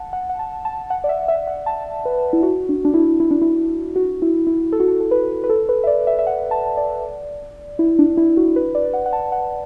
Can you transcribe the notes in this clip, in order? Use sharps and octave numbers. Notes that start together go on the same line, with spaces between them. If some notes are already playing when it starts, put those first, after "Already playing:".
Already playing: F#5 A5
F#5
F#5
A5
A5
F#5
D5
E5
E5
F#5
A5
B4
E4
F#4
D4
D4
E4
E4
D4
E4
F#4
E4
E4
A4
F#4
A4
A4
B4
B4
A4
B4
E5
D5
E5
E5
F#5
A5
D5
E4
D4
E4
F#4
B4
D5
F#5
F#5
A5
F#5